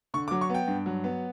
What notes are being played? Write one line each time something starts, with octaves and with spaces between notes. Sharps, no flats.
D3 C#6
D6
F#3
C#6
B3 G5
G2
F#3
B3